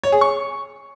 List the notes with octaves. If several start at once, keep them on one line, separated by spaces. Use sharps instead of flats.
C#5
G#4
C#6